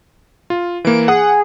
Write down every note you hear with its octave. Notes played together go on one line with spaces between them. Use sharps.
F4
E3 A#3 D7
G#4 F#5